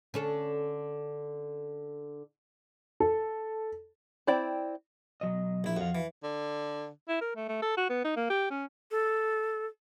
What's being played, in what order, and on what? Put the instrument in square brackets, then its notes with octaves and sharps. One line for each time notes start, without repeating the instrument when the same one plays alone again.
[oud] D3 C#4 A4
[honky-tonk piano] A4
[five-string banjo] C4 E4 D5 G5
[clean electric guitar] B1 F#3 D#5
[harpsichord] A#1 E4
[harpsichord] F2 [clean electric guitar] F#4 F5
[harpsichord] E3
[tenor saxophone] D3
[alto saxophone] E4
A#4
A3
A3
A4
F#4
B3
D#4
A#3
G4
C#4
[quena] A4